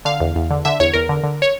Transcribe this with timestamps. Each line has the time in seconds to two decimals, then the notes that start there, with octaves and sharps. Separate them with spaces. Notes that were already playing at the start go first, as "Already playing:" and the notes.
0.05 D3 F5
0.20 E2
0.36 E2
0.50 D3
0.65 D3 E5
0.80 E2 C#5
0.94 E2 A#4
1.09 D3
1.23 D3
1.42 C#5